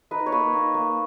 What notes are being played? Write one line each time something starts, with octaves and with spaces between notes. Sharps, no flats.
D#4 B4
C#5
A#3 B4
D#4
A#3